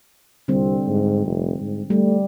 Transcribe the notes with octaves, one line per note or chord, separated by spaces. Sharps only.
C2 D3 G3 C4
G#2
F1
G#2
G3 A3